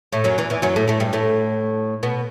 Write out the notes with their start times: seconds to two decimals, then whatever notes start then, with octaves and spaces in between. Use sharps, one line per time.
0.12 A2 A3
0.24 F#2 F#3
0.38 E2 E3
0.50 E2 E3
0.62 F#2 F#3
0.76 A2 A3
0.88 A2 A3
1.00 G2 G3
1.13 A2 A3
2.03 B2 B3